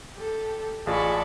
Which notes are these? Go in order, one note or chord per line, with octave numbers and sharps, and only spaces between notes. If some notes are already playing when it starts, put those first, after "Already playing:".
G4 A4
A1 F4 G#4 D5 A5 B5 C#6